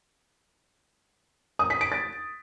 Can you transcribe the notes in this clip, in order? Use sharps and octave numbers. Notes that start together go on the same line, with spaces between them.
D#6
B6
D7
A6